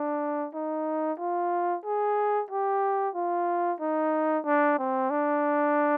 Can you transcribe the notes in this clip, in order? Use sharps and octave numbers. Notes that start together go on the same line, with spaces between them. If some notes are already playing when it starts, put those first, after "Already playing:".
Already playing: D4
D#4
F4
G#4
G4
F4
D#4
D4
C4
D4